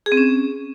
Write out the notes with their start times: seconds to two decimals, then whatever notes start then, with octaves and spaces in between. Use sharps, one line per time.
0.06 G#4
0.12 C4
0.17 C#4